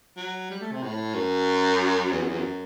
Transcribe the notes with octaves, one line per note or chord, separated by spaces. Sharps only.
F#3
G3
A3
C3
A2
F#2
E2
F#2
E2
F#2